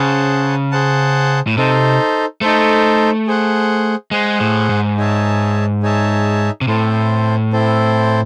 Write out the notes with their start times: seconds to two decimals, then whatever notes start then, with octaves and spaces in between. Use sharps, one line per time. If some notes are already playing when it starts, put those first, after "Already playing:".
Already playing: C#3 G#4 C5 F#5 A5
0.72 G#4 C5 F#5 A5
1.47 A2
1.57 C3 D#4 A4 C5
2.41 A3 D#4 A4 C5
3.27 G#4 C5 F#5
4.11 G#3 G#4 C5 F#5
4.40 A2
4.69 G#2
4.97 D#4 G#4 C#5 E5 A5
5.83 D#4 G#4 C#5 E5 A5
6.61 C3
6.67 A2 C4 E4 A4 C5
7.53 C4 E4 A4 C5